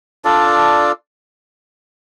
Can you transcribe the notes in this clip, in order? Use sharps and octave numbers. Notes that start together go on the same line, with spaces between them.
D4 F4 A4 D5